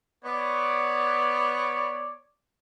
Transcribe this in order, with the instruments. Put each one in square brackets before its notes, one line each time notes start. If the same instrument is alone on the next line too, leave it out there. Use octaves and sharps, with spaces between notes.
[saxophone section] B3 [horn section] C#5 D5